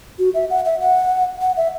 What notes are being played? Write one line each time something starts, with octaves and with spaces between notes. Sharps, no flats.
F#4
E5
F#5
E5
F#5
F#5
E5